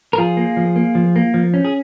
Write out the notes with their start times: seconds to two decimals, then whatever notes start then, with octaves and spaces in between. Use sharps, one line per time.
0.13 A#4
0.18 F3 F4 G#4
0.37 A#3
0.57 F3
0.76 A#3
0.95 F3
1.16 A#3
1.34 F3
1.54 C#4
1.65 G#4